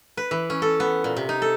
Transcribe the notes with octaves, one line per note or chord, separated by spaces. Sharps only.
B4
E3
C#4
A4
B3
A#2
C3
D#4
A4